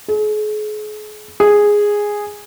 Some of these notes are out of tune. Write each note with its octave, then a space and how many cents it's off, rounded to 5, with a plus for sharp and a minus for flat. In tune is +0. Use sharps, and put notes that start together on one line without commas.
G#4 +40
G#4 -5